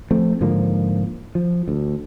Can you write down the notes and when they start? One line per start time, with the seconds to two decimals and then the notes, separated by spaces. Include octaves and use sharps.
0.11 F3 A3 C4
0.41 G#2 D3 F3 A#3
1.35 F3
1.68 D2